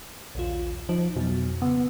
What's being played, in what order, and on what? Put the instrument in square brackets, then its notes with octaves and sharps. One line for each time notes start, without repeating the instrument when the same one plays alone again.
[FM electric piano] A#1 D#2 F4
[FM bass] F3 [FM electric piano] D#4
[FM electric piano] F2 F#3 [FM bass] B2
[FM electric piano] C#3 [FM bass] B3